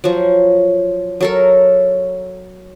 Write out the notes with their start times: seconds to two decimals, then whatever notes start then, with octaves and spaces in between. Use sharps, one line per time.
0.04 F3 F#3
1.21 F#3 A4 A#4